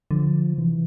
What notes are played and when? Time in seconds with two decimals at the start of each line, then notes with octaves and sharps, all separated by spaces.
0.11 D3 F3
0.58 C3 E3